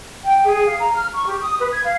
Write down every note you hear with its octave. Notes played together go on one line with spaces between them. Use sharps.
G5
G#4
F5
A#5
F6
C#6
G4
D#6
B4
G#6
F5